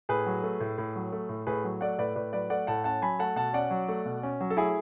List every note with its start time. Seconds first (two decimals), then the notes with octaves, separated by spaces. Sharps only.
0.09 A2 G#4 B4
0.26 F#3
0.43 A3
0.60 A2
0.78 A2
0.96 F#3
1.12 A3
1.29 A2
1.47 A2 G#4 B4
1.64 F#3
1.81 A3 D5 F#5
1.98 A2 B4 D5
2.15 A2 B4 D5
2.33 F#3 B4 D5
2.50 A3 D5 F#5
2.67 A2 F#5 A5
2.84 C#4 F#5 A5
3.02 F#3 G#5 B5
3.19 A3 F#5 A5
3.36 B2 F#5 A5
3.53 C#4 D5 F#5
3.70 F#3
3.88 A3
4.05 B2
4.23 C#4
4.40 F#3
4.50 A4
4.57 A3 E4 G#4